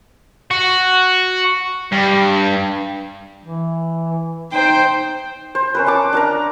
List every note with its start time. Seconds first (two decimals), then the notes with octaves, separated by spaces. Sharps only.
0.51 F#4
1.92 G2
3.45 E3
4.52 D#4 C5 G5
5.55 C5
5.75 C#4 A#4 B4
5.86 F#5 A5 D6
6.13 D4 A#4 A#5